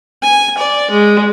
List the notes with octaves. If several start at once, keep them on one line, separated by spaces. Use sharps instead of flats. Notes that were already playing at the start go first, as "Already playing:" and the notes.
G#5
D5
G#3